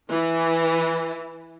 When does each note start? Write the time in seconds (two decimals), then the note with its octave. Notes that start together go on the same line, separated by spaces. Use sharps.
0.10 E3